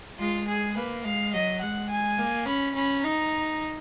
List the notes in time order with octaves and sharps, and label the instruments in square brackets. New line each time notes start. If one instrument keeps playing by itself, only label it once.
[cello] G#3 [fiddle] F4
[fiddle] G#4
[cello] A#3 [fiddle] B4
[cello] G#3 [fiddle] F5
[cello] F#3 [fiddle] D#5
[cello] G#3 [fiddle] F#5
[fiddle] G#5
[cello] A#3
[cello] C#4 [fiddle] B5
[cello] C#4 [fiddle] B5
[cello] D#4 [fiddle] A#5